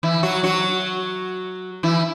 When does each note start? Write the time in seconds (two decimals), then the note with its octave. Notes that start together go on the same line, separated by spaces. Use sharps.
0.03 E3 E4
0.23 F#3 F#4
0.43 F#3 F#4
1.83 E3 E4